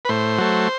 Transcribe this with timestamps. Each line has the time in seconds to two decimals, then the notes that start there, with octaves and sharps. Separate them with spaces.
0.05 B4
0.09 A2 C5
0.38 F#3 A3